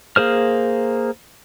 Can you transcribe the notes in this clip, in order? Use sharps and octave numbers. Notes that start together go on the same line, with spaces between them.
A#3 G#4 C5 F6